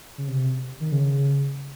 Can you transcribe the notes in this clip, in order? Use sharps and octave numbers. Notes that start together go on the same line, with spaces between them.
C#3
C3
D#3
C#3